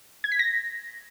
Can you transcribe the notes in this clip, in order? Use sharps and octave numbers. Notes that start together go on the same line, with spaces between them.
G#6
B6
A#6